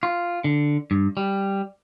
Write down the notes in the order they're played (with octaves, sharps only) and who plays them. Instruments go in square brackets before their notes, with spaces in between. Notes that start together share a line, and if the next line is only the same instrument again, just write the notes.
[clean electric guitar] F4
D3
G2
G3